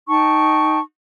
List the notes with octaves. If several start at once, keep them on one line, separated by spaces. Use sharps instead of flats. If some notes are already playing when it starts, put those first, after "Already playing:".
D#4 G5 A5 C#6